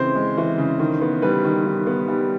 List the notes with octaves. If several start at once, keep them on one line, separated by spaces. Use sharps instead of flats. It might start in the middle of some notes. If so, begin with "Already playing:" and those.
Already playing: C#3 E3 G#3 C4 C5
G#3
E3
C#3
D#3
B3
G3 B4
D#3
D#3
B3
G3